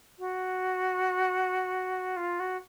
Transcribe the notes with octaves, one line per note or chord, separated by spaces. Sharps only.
F#4
F4
F#4